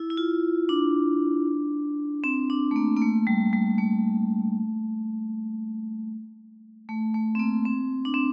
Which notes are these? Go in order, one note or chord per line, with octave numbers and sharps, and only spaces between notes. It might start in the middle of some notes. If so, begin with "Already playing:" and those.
Already playing: E4
E4
F4
D4
C4
D4
A3
A#3
A#3
A3
G3
G3
A3
A3
A3
C4
A#3
C4
D4
C4